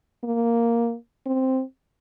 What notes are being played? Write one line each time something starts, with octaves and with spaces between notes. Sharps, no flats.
A#3
C4